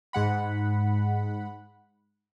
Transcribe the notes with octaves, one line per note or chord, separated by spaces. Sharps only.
G#2 G#3 F#5 B5